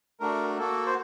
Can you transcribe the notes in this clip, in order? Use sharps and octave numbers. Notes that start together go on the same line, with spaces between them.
A3 D4 F#4 A#4
A#3 F#4 A4
C5